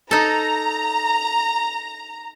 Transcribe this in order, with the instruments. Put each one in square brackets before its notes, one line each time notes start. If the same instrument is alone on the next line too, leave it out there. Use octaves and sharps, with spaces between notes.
[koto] D#4 A4 [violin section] A#5